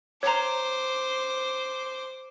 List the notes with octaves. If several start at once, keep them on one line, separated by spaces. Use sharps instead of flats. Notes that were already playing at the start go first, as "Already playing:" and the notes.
C5 C#5 A#5 D6